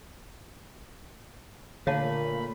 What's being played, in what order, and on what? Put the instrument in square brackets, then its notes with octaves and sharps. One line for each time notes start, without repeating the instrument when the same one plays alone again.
[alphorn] A#2 [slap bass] D3 [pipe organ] A3 A#3 B5 [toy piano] C#5 F5 A5